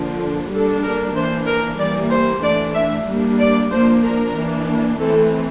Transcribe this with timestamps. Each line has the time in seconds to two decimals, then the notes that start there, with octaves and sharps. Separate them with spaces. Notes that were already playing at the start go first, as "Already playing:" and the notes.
Already playing: D3 F3 A#3 D4
0.51 G3 A#3 D4 A4
0.83 A#4
1.15 E3 A#3 D4 C5
1.47 A#4
1.79 E3 G3 A#3 D5
2.11 C5
2.43 E3 A3 D4 D5
2.75 E5
3.07 G3 A#3 D4
3.39 D5
3.71 F3 A#3 D4 C5
4.03 A#4
4.36 E3 A#3 D4
4.99 E3 A3 C4 A4